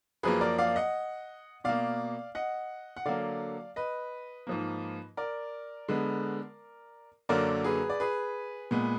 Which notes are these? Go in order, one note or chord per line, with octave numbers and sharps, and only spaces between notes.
F#2 F3 A#3 G#4 B4
A#4 D5
D5 F5
D#5 F#5
B2 A#3 D5 F5
D#5 F#5
F#5
D3 F#3 A#3 D5 F5
B4 D#5
G#2 F3 A#3
A#4 D5
D3 G#3 B3
F#2 D3 F#3 A#3 A#4 D5
G#4 B4
D5
G#4 B4
A#2 G#3 B3